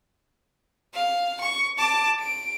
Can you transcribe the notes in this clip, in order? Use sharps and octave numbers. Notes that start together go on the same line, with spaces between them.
F5
C#6
A5 D6
D7